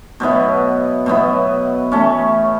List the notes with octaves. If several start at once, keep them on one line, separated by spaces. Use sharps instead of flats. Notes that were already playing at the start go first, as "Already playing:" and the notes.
B2 F#3 B3 E4
B2 F#3 B3 E4
E3 A3 C#4